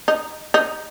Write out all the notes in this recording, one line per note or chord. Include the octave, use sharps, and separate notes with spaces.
D#4
D#4